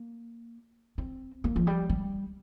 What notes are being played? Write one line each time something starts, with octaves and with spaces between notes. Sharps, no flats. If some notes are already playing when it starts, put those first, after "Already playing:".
Already playing: A#3
C4
A#3
F3
G3
G3